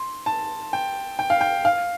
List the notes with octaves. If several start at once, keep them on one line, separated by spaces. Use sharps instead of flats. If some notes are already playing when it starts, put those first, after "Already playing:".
Already playing: C6
A5
G5
G5
F5
G5
F5